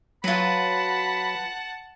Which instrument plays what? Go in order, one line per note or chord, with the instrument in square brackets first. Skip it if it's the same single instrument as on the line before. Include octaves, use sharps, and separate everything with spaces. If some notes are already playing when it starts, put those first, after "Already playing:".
[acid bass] F#3 [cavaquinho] F4 B4 [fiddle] F#5 A5 [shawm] B5